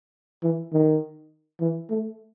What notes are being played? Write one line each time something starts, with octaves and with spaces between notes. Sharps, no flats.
E3
D#3
E3
A3